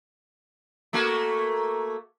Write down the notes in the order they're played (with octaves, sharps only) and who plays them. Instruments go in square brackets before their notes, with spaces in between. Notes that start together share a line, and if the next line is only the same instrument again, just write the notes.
[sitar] A3 A#3 F#4